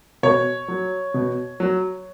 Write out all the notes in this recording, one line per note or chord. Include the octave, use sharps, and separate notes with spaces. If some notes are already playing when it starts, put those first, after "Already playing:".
B2 C#5
F#3
B2
F#3